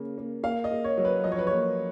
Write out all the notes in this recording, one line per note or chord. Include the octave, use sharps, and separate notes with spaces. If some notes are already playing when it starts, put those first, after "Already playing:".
Already playing: C#3 A#3
A#3
A#3 F5
D#5
A#3
C#5
F#3
B4
F3 D#5
C#5
B4
A#3 C#5